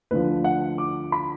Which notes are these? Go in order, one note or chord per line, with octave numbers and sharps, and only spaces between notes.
D2 D3 F3 B4
F#5
D6
B5